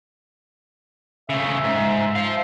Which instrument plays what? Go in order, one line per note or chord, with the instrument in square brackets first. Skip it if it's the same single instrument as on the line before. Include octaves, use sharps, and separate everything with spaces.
[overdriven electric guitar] C#3 A3 [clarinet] E5
[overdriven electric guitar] G#2
C5 F5